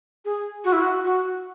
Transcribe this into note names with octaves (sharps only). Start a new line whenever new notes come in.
G#4
F#4
E4
F#4
F#4